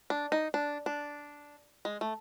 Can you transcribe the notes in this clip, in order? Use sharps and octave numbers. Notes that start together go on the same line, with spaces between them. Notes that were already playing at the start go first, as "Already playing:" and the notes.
D4
D#4
D4
D4
G#3
A3